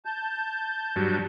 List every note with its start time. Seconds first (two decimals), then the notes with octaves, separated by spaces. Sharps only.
0.05 A5 G6
0.96 G2 F#3